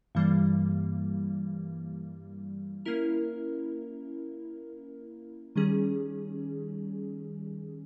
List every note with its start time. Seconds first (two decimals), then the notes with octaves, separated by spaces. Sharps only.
0.15 G2 E3 G3 A#3
2.85 A#3 C#4 E4 A#4
5.56 D#3 G3 C#4 G#4